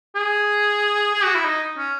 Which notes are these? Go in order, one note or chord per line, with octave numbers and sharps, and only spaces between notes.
G#4
G#4
F#4
E4
D#4
C#4